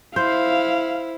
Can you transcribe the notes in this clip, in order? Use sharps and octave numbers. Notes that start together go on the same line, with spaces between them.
E4 C5 F5